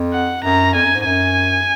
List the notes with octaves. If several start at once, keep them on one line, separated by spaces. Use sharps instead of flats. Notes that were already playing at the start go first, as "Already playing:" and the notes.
Already playing: F2
F#5
F#2 A#5
F2 G#5
F#2
G#2
F#2 G#5